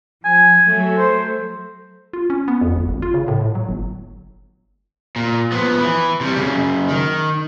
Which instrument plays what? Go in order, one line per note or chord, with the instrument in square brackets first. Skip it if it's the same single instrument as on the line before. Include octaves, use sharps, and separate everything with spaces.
[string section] F3 [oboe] G#5
[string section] F#3 A3
[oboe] C5
[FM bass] F4
C#4
B3
F2
G1
G#1
F4
C#3
A2
A2
F#3
G1
[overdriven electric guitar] A#2
F3 B3
E3
C3 G3
F#2 C#3
D#3